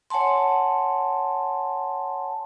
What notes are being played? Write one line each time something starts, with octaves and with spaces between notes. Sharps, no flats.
C#5 F#5 G#5 A5 C6